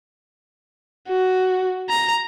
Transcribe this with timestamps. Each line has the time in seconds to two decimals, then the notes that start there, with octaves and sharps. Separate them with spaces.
1.09 F#4
1.90 A#5